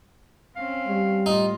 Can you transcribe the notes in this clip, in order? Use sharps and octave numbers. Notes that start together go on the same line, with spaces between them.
C4 C#4 F5
G3
A2 D#4 F4